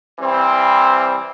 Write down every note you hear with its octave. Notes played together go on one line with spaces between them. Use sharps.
E3 G3 C4